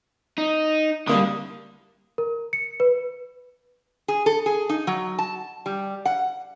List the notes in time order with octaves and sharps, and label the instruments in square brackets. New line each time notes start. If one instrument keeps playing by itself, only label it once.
[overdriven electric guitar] D#4
[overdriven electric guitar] D3 [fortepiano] G3 A#3 D#6
[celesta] A#4
C#7
B4
[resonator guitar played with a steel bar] G#4
A4
G#4
D#4
F#3
A5
G3
F#5